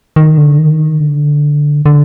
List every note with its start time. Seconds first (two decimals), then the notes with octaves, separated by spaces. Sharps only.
0.16 D#3
0.38 D3
0.58 D#3
1.00 D3
1.86 D3